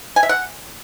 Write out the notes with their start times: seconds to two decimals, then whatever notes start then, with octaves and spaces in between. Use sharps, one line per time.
0.16 G#5
0.23 E5
0.29 F#5